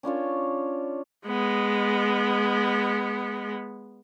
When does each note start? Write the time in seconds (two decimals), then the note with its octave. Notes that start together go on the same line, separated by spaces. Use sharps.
0.03 C#4 D4 F4 C#5
1.27 G#3 B3